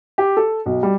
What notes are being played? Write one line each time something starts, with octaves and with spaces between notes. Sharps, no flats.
G4
A4
B1
G3